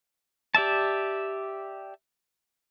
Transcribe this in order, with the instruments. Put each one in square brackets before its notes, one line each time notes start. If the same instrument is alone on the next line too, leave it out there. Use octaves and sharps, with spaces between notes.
[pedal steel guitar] G4 D5 E5 A5